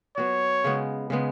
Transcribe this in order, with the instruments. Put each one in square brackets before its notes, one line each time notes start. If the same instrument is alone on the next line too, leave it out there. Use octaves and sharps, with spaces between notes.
[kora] F#3 B3 F#4 [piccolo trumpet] C#5
[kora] C#3 G#3 B3
C#3 G#3 B3